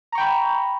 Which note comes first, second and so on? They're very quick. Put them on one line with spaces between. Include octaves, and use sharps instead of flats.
A#5 C#6 G5 B5